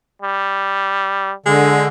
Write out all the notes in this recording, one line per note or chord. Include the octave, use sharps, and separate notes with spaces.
G3
D3 G#3